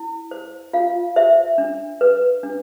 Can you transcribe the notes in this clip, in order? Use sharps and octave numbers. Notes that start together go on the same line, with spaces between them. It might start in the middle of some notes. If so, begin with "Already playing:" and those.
Already playing: E4
C5
F4 F5
C5 E5
D4
B4
D4